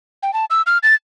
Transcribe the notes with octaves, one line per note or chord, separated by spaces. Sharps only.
G5
A5
E6
F6
A6